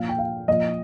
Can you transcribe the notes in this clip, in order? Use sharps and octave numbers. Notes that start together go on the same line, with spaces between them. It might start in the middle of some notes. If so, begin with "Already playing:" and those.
Already playing: A#2 F3 F5
G5
F5
A#2 F3 D#5